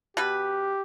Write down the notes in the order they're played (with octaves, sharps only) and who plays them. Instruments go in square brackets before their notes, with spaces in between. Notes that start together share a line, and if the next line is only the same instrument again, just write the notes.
[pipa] B2 B4 [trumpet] G4